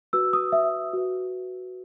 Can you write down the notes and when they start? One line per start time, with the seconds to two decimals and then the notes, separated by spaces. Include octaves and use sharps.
0.13 F#4 B4 E6
0.33 D#6
0.52 E5
0.93 F#4 B4